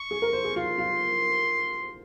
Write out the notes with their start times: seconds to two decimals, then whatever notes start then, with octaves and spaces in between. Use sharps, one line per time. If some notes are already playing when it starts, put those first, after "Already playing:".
Already playing: C#6
0.11 G#4
0.22 A#4
0.33 C5
0.44 G#4
0.56 F4 C6
0.78 F4